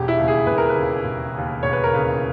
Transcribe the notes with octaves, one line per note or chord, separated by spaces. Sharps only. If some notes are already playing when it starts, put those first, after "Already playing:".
Already playing: E1 G4
E4
D#2 C#3
G#4
E1 B4
A#4
B4
D#2 C#3
E1
D#2 C#3
E1 C#5
B4
A#4
D#2 C#3 B4